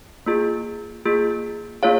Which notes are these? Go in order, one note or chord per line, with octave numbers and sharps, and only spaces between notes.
A#3 F4 G#4
A#3 F4 G#4
A#3 F4 G#4 C#5 F5